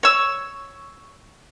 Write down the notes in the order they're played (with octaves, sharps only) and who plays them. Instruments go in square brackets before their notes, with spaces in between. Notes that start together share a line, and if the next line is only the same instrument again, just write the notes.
[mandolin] C#5 E6